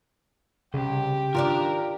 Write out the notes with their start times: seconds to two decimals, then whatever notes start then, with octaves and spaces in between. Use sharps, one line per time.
0.74 C2 C#3 G4
1.35 D#3 D4 F4 A#4 D5